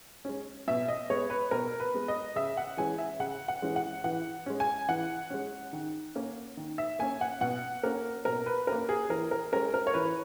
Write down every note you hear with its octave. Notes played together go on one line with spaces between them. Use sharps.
G#3 C#4
B2 E5
D#5
G#3 B3 C#5
B4
B2 A#4
B4
G#3 B3
D#5
C#3 E5
F#5
E3 G#3 C#4 G#5
E5
C#3 F#5
F#5
E3 G#3 C#4
F#5
E3 F#5
G#3 C#4
G#5
E3 F#5
G#3 C#4
D#3
A#3 C#4
D#3
E5
A#3 C#4 G#5
F#5
B2 F#5
A#3 C#4 A#4
B2 A#4
B4
A#3 C#4 A#4
G#4
E3 A#4
A#4
G#3 C#4 A#4
A#4
C#5
E3 B4